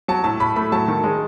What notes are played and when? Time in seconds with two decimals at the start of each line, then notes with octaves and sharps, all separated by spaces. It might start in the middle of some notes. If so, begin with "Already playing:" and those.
0.08 F#3 A5
0.24 A2 A5
0.40 A2 B5
0.56 A3 B5
0.72 F#3 A5
0.88 D#3
1.04 G#3